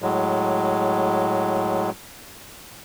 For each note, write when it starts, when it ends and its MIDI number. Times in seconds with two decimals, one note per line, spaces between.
0.02 1.90 45
0.02 1.90 54
0.02 1.90 56